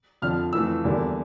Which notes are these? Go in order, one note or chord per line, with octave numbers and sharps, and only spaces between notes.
F2 D3 F3 F6
F2 E3 A3 E6
E2 D3 G3 A#3